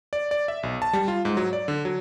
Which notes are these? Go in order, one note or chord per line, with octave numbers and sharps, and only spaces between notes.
D5
D5
E5
B1
A5
G3
F4
G#2
F#3
D5
D3
F#3